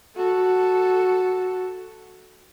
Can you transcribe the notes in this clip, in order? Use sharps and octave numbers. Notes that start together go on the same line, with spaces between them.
F#4 A4